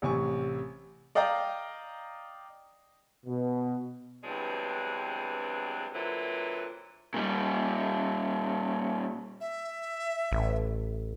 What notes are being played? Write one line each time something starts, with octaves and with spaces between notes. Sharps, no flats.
A1 C3 G#5 C#6
D5 D#5 F5 G5 A#5
B2
E2 G2 F#3 G#3 C4 D4
A#2 D3 F#3 C4 E4 B4
A#2 G3
E5
A1